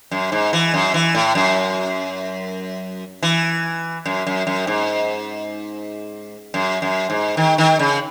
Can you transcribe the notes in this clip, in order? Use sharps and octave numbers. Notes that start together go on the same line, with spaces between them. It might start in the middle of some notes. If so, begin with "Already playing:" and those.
F#2
G#2
E3
F#2
E3
A2
F#2
E3
F#2
F#2
F#2
G#2
F#2
F#2
G#2
D#3
D#3
C#3